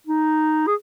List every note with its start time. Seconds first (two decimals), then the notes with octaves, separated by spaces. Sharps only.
0.07 D#4
0.67 G#4